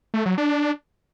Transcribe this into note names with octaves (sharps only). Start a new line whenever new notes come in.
A3
F#3
D4